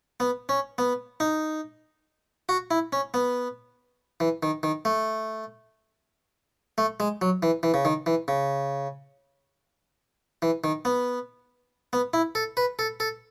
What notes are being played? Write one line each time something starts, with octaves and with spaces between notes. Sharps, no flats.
B3
C#4
B3
D#4
F#4
E4
C#4
B3
E3
D#3
D#3
A3
A3
G#3
F#3
E3
E3
C#3
D#3
E3
C#3
E3
D#3
B3
B3
E4
A4
B4
A4
A4